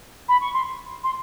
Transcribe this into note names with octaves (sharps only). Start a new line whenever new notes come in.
B5
C#6
C6
C6